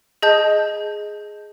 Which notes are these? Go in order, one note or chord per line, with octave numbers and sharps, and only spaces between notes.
G#4 D#5 A5 G6